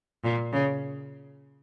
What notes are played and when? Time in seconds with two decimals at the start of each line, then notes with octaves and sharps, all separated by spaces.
0.24 A#2
0.53 C#3